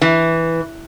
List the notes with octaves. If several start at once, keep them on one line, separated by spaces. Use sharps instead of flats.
E3